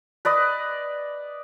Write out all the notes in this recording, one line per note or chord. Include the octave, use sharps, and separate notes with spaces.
B4 D5 D#5